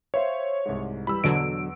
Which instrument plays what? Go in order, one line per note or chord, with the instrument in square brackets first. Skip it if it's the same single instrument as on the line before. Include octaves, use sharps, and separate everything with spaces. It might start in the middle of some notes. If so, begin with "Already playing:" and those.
[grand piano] C5 E5 F5 [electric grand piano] C#5
[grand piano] C2 G#2
[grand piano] E3 G3 [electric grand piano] B5 E6
[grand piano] E2 [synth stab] B2 D3 F#3 [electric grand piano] D7